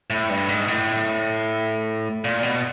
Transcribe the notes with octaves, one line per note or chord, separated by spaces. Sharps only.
A2
G2
G#2
A2
A#2
B2